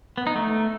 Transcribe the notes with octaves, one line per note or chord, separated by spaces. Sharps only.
B3
D#4
A3